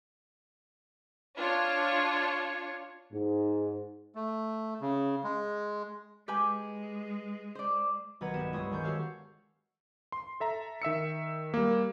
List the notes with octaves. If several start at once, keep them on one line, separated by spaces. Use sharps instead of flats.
D4 F4 C#5
G#2
A3
C#3
G#3
G#3 G4 B4 G#5
C5 D5
B1 D#3 B4 F#5 A#5 G#6
G2 B3 G4 G#6 E7
C#2 G2 G#3 C#6 D#6
D#3 G#3 D4 C#6 G6
F#4 G4 A4 C#5 F5 A5
C6
A4 E5 A#5
D#3 E5 E6 C#7
G3 A#3